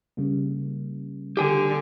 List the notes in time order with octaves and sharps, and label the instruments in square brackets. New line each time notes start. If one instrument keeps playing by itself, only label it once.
[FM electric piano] C#3 G3 A#3
[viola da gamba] D3 [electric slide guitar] G4 G#5